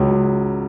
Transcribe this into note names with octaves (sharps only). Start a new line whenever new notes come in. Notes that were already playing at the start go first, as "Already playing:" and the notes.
Already playing: C#2 C#3 F#3